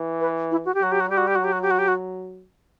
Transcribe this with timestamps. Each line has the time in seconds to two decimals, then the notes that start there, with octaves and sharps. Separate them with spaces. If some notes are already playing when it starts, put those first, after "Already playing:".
Already playing: E3
0.21 B4
0.51 E4
0.65 F#4
0.75 G4
0.81 F#3 F#4
0.92 G4
1.00 F#4
1.10 G3 G4
1.17 F#4
1.27 G4
1.35 F#4
1.39 F#3 G4
1.52 F#4
1.62 G4
1.71 F#4
1.79 G4
1.88 F#4